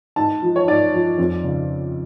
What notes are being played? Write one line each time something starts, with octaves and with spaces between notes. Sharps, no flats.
G#2 A5
F3
C#5
G#2 D5
F3
F2
C#3